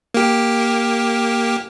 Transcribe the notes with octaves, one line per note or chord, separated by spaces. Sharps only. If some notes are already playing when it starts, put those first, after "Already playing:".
A#3 G4